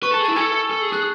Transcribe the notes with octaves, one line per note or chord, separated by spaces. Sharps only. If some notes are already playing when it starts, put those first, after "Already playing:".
B4 C#6
A4 A5 A6
G#4
A5 A6
E4
A4 G#5 G#6
A4
G#4
G#4 F#6